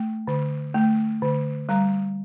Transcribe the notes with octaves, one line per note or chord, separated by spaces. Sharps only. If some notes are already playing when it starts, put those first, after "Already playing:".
Already playing: A3
D3
A3
D3
G3 A#5